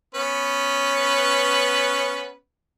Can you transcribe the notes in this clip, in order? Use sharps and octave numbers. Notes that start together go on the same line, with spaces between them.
B3 C#4 B4